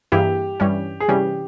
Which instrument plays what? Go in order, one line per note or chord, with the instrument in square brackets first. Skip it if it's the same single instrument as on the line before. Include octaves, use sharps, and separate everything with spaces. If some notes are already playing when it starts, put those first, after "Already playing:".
[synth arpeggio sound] G2 E3 A#3 E4 G#4 [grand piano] G4
[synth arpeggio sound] G2 E3 G3 C#4
[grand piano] G#4
[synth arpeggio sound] C3 E3 G3 C#4 [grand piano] G4